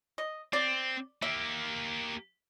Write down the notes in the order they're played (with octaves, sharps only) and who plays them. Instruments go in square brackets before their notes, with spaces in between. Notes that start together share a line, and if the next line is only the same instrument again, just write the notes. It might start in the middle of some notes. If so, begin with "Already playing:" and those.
[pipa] D#5
[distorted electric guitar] C4 [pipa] D5
[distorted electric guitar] A#3 G4 [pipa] E5